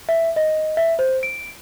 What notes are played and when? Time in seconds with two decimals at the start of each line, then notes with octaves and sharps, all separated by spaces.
0.09 E5
0.36 D#5
0.77 E5
0.99 C5
1.23 D7